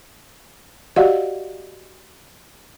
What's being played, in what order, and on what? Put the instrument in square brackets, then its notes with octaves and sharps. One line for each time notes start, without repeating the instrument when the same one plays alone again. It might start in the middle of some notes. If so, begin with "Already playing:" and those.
[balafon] F#4 G4 D5 D#5 F5 F#5